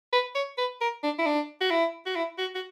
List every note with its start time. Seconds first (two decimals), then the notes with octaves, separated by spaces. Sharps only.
0.13 B4
0.35 C#5
0.58 B4
0.81 A#4
1.03 D4
1.18 E4
1.26 D4
1.61 F#4
1.71 E4
2.06 F#4
2.16 E4
2.38 F#4
2.55 F#4